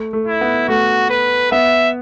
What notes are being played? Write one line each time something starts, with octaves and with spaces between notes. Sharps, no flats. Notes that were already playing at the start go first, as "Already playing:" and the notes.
Already playing: A3
A3
E4
B3
A3 F#4
B4
B3 E5